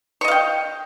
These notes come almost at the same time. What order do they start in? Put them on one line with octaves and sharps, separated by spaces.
C#6 D#5 F5 G5